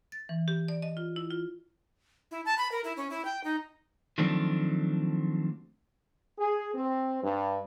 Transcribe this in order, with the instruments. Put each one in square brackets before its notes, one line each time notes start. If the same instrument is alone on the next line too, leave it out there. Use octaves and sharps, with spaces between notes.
[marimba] A6
E3
G4
D5
D#5
F4
E4
F4
[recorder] E4
A5
B5
A#4
E4
C#4
E4
G5
D#4
[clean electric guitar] D#3 F3 F#3 A3 C4 D4
[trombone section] G#4
C4
G2